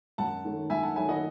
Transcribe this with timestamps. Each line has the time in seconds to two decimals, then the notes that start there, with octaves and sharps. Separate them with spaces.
0.18 F#2 F#5 A5
0.44 D#3 F#3 A3
0.70 F#2 E5 G#5
0.83 F#5 A5
0.96 D#3 F#3 A3 E5 G#5
1.09 D#5 F#5